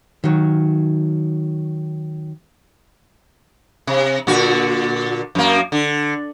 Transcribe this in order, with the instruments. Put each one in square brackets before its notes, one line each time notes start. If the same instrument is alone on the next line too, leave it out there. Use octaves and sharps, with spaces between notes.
[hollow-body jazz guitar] D#3 F#3
[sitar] C3
A#2 D3 F#4
F#2 A#3
D3